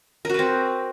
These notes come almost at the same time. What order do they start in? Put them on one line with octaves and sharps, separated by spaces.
A#4 F#4 B4 C4